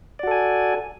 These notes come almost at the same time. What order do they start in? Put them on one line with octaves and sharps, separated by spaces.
D5 F#4 A4 G#5